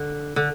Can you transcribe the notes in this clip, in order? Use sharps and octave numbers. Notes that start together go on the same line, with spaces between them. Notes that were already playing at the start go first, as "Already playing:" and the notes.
Already playing: D3
D3